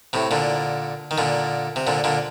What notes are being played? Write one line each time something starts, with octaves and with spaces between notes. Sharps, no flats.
A2 C3
A#2 D3
D#3
A#2 D3
C3
A#2 D3
A#2 D3